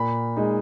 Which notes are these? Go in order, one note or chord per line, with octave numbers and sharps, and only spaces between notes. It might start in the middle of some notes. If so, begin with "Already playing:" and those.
Already playing: A#2 B5
G#3 D#4